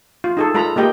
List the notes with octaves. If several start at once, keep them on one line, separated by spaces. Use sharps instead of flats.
F4
D#4 G#4 A4
G#3 F4 A4 A#5 B5
G#3 A#3 G4 D#5 G5